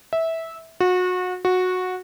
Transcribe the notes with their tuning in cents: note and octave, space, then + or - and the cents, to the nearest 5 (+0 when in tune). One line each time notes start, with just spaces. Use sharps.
E5 -15
F#4 -30
F#4 -15